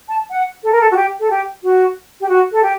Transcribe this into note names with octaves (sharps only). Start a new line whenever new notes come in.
A5
F#5
A4
A#4
A4
F#4
G4
A4
G4
F#4
G4
F#4
A4
G4